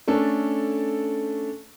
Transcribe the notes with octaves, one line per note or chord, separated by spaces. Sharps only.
A3 C#4 D4 A4